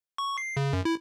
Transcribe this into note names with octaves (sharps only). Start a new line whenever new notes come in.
C#6
C7
C#3
F#2
E4